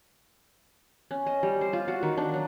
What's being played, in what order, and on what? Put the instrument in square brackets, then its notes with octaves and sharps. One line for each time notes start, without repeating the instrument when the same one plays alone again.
[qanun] C#4
D#5
G3
C5
F4
F#4
D#3
D4
F#3